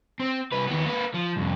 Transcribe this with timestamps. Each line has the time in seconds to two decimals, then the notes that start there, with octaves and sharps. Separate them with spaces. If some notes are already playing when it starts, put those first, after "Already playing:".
0.20 C4
0.52 C2 B4
0.67 D#2 B3
0.85 A#3 B4
1.14 F3
1.36 C2 F2